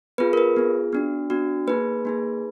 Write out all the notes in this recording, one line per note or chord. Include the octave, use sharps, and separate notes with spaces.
B3 F4 G#4 B4
A#4
B4
B3 F4 G#4
B3 D4 F#4
B3 D4 F#4
A#3 D#4 G#4 B4
A#3 D#4 G#4